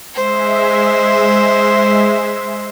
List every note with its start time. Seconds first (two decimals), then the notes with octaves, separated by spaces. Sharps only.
0.14 G#3 C5 E5